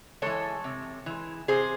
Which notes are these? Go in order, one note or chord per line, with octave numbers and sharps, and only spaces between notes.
E3 G#3 A4 C#5
C3
E3 G#3
C3 G#4 C5